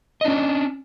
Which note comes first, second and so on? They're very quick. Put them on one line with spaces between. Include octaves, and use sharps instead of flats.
D#5 D4 C#4